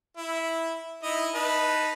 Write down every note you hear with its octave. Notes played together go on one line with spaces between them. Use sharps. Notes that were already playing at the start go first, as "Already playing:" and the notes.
E4
D#4 E4 D#5
D#4 B4 A5